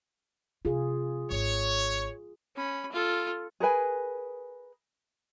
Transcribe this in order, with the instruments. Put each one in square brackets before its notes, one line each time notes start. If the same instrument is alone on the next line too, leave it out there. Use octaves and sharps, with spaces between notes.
[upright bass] C3 [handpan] F4 G#4
[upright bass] G#1 [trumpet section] C#5
[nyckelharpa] C#4 B5
F4 A4
[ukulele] G#4 A#4 B4 G#5